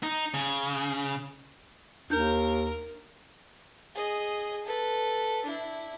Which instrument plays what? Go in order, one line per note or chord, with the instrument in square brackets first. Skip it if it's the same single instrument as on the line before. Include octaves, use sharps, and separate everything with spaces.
[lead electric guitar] D#4
C#3
[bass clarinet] D#2 [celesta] D4 D#4 G6 [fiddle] A#4
[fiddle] G#4 D#5
A4 B4
D4 E4